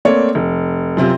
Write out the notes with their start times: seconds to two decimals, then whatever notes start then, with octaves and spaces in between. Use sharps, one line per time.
0.05 A3 A#3 C4 C#5 D5
0.35 F1
0.97 F#2 C3 C4 F4